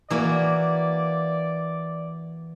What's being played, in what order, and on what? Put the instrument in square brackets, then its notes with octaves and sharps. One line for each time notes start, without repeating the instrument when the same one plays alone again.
[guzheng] E3 A#3 F#4 [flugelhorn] D5